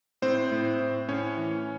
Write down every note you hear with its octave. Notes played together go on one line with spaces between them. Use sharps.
A2 C4 C5
A2
A2
A2 C#4 C#5
E3